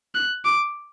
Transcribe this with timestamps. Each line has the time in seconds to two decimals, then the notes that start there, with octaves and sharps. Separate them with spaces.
0.15 F#6
0.45 D6